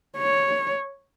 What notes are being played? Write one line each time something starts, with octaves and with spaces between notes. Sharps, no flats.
C#5